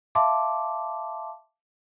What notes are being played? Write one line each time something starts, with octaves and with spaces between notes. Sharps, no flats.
E5 F5 A5 C6 D6